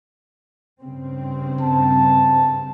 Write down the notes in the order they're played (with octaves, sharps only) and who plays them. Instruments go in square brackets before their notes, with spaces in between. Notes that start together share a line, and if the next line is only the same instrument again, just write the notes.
[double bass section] G2 C#3 C4
[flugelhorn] A5